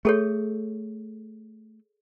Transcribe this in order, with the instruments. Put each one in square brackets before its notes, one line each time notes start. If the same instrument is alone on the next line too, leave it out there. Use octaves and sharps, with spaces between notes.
[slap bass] A3 [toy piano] G#4 A4 C#5